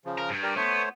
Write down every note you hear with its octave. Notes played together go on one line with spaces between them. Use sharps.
C#3 F3
A#4
G2
G4 A#4 D5
A3 B3 C5 C#5